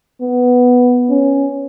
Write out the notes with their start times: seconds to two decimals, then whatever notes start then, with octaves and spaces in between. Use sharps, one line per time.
0.21 B3
1.09 C#4